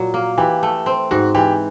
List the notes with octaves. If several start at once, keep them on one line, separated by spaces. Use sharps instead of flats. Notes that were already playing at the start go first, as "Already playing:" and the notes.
Already playing: A#2 F#3
A#3
E3 G4
A3
C4
G#2 F#4
E3 G4